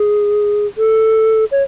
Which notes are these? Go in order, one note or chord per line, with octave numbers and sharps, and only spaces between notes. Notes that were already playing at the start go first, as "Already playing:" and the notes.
Already playing: G#4
A4
C#5